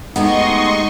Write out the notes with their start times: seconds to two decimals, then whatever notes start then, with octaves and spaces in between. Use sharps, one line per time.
0.16 G#3 A3 B3 D#4 G4 D#5 C6 C#6